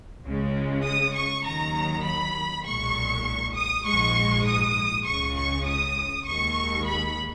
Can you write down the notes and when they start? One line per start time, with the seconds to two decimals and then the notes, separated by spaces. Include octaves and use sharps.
0.24 C#2 C#3 G#3
0.85 D#6
1.15 C#6
1.45 D#2 D#3 F#3 A#5
2.05 B5
2.65 B1 A#2 G#3 C#6
3.56 D#6
3.85 A#1 G#2 F3 G#3 C#6
4.46 D#6
5.06 C#2 C#3 G#3 C#6
5.36 C#6
5.66 D#6
6.26 D#2 D#3 G#3 C#6
6.86 B5